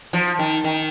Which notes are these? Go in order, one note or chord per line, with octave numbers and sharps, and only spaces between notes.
F3
D#3
D#3